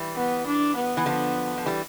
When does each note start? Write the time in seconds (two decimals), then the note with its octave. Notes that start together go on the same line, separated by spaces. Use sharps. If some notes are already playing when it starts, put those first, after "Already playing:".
Already playing: E3 G3
0.16 B3
0.46 D4
0.76 B3
0.97 E3
1.06 D3 F3
1.57 F3
1.66 E3 G3